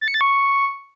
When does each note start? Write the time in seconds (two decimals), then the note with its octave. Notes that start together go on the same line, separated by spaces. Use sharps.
0.01 A6
0.08 C#7
0.14 A6
0.21 C#6